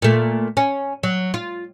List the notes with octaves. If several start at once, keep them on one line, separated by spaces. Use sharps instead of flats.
A#2 A3
C#4
F#3
F4